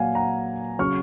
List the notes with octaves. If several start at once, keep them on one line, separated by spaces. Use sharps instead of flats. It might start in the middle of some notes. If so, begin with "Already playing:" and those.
Already playing: A#2 F#3 A#3 F5 F#5 G#5
F#5 A#5
C#3 F#3 C#4 C#6 F6